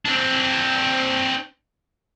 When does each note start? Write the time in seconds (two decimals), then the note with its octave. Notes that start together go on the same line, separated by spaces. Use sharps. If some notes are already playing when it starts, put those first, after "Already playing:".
0.05 C4 D4